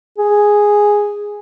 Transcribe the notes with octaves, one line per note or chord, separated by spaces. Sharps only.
G#4